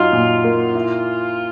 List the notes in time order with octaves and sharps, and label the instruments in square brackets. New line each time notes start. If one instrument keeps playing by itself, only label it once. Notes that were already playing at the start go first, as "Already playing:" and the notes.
Already playing: [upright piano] F#2 F#3 D#4 [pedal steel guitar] F4
[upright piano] A#2
A#3
E4